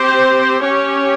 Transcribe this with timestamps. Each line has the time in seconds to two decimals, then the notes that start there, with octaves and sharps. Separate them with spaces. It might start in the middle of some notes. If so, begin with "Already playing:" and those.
Already playing: C4 G4 C5
0.64 C#4 G4 C#5